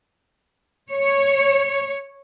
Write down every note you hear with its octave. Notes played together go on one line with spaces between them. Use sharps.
C#5